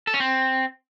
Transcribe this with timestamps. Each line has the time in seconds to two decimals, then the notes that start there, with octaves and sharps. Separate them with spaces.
0.07 A4
0.14 C#4
0.20 C4